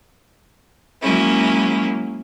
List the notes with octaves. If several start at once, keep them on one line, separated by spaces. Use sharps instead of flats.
F#3 G#3 A#3 C#4 E4